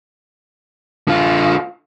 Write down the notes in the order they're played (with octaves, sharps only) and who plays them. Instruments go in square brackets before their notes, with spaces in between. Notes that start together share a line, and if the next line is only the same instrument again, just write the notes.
[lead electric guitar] D3 F4